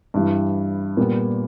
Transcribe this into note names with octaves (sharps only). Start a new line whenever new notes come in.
G2 E3 G3
A#2 G3 B3